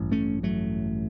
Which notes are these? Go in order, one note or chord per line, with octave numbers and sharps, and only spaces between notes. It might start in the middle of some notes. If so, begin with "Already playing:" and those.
Already playing: A1 G2
A3 C#4
F#3 A3